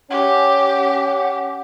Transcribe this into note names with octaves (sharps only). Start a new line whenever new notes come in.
C#4 G4 F#5